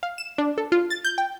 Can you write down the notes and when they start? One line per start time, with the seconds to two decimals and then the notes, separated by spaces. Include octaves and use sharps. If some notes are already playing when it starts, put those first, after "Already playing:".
0.03 F5
0.18 E7
0.38 D4
0.58 A4
0.72 F4
0.90 A6
1.04 G6
1.18 G5